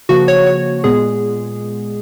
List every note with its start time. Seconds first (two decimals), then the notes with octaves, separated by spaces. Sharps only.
0.09 C#3 F3 A#3 F#4
0.28 C#5
0.46 C#5
0.84 A#2 G#3 B3 G#4